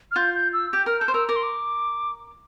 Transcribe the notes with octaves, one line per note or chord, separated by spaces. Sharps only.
F6
F4 G6
G6
E6
G4 G6
A#4 F6
A4 G6
C5
A#4 E6
A#4 D6
C6
D6